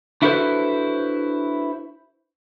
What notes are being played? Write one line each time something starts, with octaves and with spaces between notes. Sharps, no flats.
D4 E4 F#4 A4 B4 C5